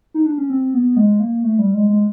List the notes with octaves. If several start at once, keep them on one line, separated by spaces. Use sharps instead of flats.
D#4
D4
C#4
C4
B3
G#3
A#3
A3
G3
G#3
G#3